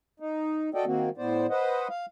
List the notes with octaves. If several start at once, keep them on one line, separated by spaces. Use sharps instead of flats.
D#4
F#4 A4 D5 D#5 G5
D#3 A#3 C4 F#4
A2 B3 C5 D5
B4 C5 D#5 F#5
F5